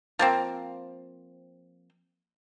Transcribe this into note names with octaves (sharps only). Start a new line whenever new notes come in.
F3 A#3 C4